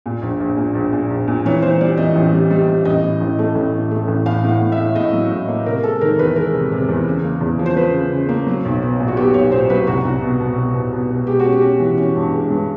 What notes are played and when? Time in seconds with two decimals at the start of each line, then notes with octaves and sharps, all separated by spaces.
0.06 A#2
0.22 A#1
0.40 A#1
0.57 A#2
0.75 A#1
0.92 A#2
1.10 A#1
1.27 A#2
1.45 E3 C#5
1.62 E3 C5
1.81 G3 D5
1.97 E3 D#5
2.16 A1
2.32 G3
2.51 G3
2.68 G3
2.85 A1 D#5
3.03 A2
3.21 A1
3.39 A3
3.55 A1
3.74 A2
3.91 A3
4.08 A1
4.26 A2 F5
4.44 A2 F#5
4.61 A2
4.72 E5
4.78 A2
4.95 A2 D#5
5.13 F#3
5.30 A2
5.48 A#3
5.66 C3 A#4
5.83 G#3 A4
6.01 D#3 A#4
6.19 E2 B4
6.36 G#3 A#4
6.54 C3
6.72 C3
6.89 E2
7.07 C#3
7.24 A#3
7.41 E2
7.59 F3
7.66 C5
7.76 F3 B4
7.94 C#3
8.12 C#3
8.29 A#3
8.47 F#3
8.65 B1
8.82 B3
9.00 A#2
9.08 F#4
9.17 B3 G4
9.34 B1 C#5
9.52 A#2 C5
9.70 F#3 B4
9.87 C2 F#4
10.04 C2
10.22 B2
10.40 B2
10.58 B2
10.74 B2
10.93 B2
11.10 B2
11.27 G#3 G4
11.40 F#4
11.45 C#4
11.52 G4
11.62 C#4
11.80 E3
11.98 C#4
12.16 G2
12.32 G#3
12.50 G2